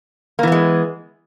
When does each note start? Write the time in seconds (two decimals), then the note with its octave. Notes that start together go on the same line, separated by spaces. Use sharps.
0.39 A#3
0.43 E3
0.48 B3
0.52 G#3